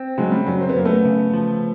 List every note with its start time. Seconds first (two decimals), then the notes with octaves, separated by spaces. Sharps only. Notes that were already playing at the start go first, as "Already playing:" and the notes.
Already playing: C4
0.18 C#3 F#3 G#3
0.32 G3
0.46 F#2 F#3
0.61 C4
0.69 B3
0.76 F#2 A#3
0.85 A3 B3
1.05 C#3
1.34 F3